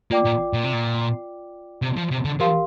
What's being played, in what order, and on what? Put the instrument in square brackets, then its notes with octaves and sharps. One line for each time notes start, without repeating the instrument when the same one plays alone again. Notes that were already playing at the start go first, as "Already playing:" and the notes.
[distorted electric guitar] A#3 [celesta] F4 D5 G5 D6
[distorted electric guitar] A#2
A#2
C3
A#2
C3
F3
C3
D3
[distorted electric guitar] F3 [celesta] G4 A#4 F5 C6